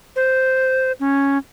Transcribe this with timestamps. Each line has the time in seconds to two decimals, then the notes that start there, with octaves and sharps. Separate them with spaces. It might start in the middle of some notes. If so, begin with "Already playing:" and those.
0.16 C5
1.00 C#4